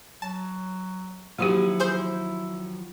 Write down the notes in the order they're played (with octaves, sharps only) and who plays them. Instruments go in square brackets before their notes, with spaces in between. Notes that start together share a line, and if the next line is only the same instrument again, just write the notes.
[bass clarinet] F#3 [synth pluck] A5
[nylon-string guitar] D#3 F3 F#3 [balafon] A#3 F#4 G4 [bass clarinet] E4
[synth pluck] G#4 C5 G6